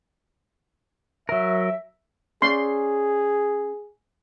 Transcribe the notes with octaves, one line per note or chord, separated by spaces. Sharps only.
F#3 A#4 E5
C#4 G#4 D5 C6